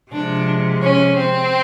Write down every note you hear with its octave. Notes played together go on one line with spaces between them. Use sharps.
C3 F3 G#3 D4
C#4
C4